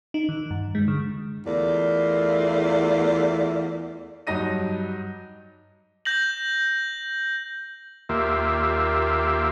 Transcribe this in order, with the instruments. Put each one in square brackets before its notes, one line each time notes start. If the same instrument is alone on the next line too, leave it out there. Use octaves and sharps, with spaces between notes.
[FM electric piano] D#4
D#3
G2
G#3
D3
[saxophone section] E2 A3 F4 A#4 D5
[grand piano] G2 F#3 D#4 A#6 D#7
[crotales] G6 A#6 F#7
[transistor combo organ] D#2 A#3 F4 G4 E5